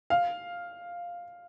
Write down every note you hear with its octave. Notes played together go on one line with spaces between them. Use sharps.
F5